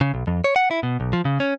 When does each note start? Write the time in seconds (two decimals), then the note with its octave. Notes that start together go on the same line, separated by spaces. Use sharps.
0.01 C#3
0.14 B1
0.27 F2
0.44 C#5
0.56 F#5
0.71 E4
0.83 B2
1.00 B1
1.13 F3
1.25 C#3
1.40 C#4